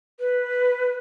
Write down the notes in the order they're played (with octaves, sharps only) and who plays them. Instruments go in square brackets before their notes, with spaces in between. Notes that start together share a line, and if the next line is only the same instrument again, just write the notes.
[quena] B4